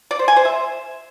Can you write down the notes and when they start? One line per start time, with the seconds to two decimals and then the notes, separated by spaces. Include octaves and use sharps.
0.11 D5
0.19 C5
0.28 G#5
0.36 C5
0.45 E5